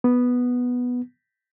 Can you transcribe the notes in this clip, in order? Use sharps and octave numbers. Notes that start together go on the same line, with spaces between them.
B3